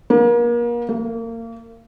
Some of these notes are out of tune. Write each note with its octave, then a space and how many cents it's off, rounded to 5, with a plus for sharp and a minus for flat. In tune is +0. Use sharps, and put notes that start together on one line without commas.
A#3 +35
A#3 -30